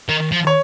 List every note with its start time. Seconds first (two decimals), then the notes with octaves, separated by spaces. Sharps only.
0.09 D#3
0.32 F3
0.47 C#5